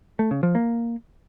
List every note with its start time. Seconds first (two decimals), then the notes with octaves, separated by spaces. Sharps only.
0.19 A3
0.31 C#3
0.43 F3
0.55 A#3